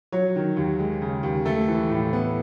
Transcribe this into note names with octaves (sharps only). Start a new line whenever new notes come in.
F#3 C#5
D#3
D#2
G#3
C#3
D#2
A3 A4
E3
A2
B3